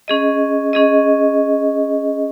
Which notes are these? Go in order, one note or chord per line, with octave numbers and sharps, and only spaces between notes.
C#4 G#4 D#5
C#4 G#4 D#5